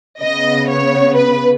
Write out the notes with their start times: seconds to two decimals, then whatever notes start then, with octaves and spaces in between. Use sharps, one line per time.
0.22 C#3 B3 D#5
0.69 C#5
1.16 B4